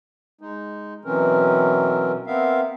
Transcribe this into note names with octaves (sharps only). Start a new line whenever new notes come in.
G#3 D#4
B2 E3 F#3 C4 C#4 A#4
B3 C4 A#4 E5 F5